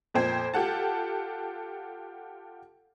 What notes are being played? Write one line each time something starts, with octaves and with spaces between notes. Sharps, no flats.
F2 A#2 C5 G5 G#6
F4 G4 A4 F#5 A5